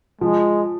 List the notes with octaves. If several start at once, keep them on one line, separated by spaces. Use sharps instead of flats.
F3 G#3